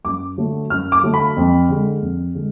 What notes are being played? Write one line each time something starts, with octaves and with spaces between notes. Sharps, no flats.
F#2 D6
D3 F#3 A3
F#2 F6
D6
D3 F#3 A3
B5
F2
D3 G#3
F2
D3 G#3